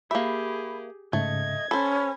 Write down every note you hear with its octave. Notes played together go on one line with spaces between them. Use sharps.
A#3 G4 G#4 E5 B5
G#2 C#3 A3 D#5 G#6
C#4 A4 C5 B5